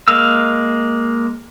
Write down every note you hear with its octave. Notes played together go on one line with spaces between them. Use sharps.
G#3 A#3 F5 E6